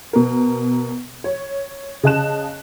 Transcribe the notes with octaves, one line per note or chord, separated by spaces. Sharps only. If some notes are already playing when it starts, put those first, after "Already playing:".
B2 A#4
C#5
C#3 G#4 D#5 A5 F#6 E7